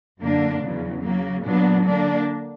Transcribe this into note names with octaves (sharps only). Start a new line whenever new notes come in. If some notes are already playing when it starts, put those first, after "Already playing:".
F#2 D3 A#3 D4
E2 C#3 F#3
C#3 F#3 A#3
A#2 F#3 B3 D4
D3 A#3 D4